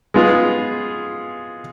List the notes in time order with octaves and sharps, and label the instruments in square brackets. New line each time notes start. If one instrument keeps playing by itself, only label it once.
[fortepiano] G#3 B3 F4 G#4